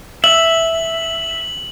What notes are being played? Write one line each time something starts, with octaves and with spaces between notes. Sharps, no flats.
E5 F#7